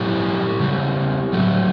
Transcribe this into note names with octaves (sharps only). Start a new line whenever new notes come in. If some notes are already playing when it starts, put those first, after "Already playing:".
Already playing: A2 F#3 E4 G4
C#3 G3
A2 F#3 A3